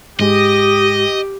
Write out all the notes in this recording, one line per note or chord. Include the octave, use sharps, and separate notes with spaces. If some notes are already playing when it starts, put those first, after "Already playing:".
G#2 G#3 G4 D#5